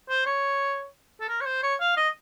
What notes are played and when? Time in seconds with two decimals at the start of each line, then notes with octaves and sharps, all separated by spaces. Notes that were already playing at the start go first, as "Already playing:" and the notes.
0.09 C5
0.26 C#5
1.20 A4
1.29 A#4
1.41 C#5
1.46 C5
1.63 C#5
1.80 F5
1.97 D#5